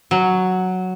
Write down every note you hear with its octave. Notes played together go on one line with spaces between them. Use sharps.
F#3